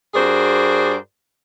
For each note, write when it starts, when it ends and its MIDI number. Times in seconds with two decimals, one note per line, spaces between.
0.14 0.95 43
0.14 0.95 66
0.14 0.95 68
0.14 0.95 70
0.14 0.95 72
0.14 0.95 74